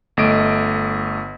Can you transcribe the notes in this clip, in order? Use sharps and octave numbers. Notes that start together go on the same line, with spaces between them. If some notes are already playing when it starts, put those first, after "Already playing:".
G1 A3 D#5 D7